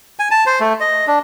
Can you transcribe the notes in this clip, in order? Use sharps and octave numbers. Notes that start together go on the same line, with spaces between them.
G#5
A5
C5
A3
D#5
D4